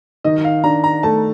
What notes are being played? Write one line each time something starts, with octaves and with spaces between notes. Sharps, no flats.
D#3 D#5
F5
D4 A#5
A#5
A3 A5